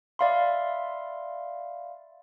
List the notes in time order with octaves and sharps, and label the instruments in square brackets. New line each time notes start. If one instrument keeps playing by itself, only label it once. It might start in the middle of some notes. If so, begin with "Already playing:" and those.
[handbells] D5 E5 F5 B5 C6